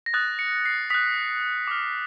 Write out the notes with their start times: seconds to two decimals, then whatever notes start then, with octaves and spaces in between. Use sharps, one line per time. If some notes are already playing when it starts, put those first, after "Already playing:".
0.06 A#6
0.13 D#6 F#6 A6
0.39 C#7
0.65 C7
0.90 D#6 F#6 B6
1.67 D6 F6